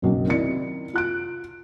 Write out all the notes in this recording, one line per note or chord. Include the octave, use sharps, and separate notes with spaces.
F#1 B1 F#2 C#3
C3 D#3 E4 D5 C#7
F4 F#6 D7